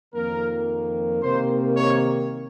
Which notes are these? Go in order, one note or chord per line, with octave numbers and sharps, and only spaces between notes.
F2 D#3 A#3 A#4
C3 D#3 A#3 C5
C#5